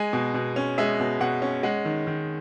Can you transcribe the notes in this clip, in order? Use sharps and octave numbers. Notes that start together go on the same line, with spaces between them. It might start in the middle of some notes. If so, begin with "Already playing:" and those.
Already playing: G#3 G#5
B2
B2
C#4
G#3 E5
B2
B2 F#5
C#4
G#3 F#5
D#3
D#3